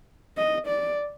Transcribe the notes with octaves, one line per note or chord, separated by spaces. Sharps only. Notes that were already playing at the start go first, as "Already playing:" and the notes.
D#5
D5